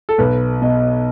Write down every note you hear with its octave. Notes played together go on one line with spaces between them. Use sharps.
A4
B1 B4
B2 D#5